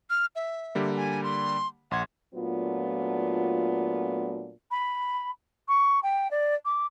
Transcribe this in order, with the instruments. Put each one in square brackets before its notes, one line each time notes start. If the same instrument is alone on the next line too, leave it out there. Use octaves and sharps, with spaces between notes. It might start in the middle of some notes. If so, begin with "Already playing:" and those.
[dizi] F6
E5
[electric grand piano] D3 G3 A#3
[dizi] G#5
C6
[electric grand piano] A#1 C6 G#6 [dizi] F#5
[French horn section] A#2 F#3 A3 B3 D4 F4
[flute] B5
C#6
G5
D5
D6